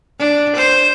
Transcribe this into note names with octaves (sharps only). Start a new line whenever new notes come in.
D4
C5